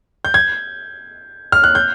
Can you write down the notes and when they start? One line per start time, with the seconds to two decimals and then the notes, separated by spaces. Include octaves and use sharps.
0.25 G6
0.34 G#6
1.52 F6
1.64 F#6
1.75 G6